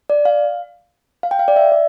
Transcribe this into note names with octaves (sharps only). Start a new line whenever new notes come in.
D5
F5
F5
G5
F5
D5
E5
D5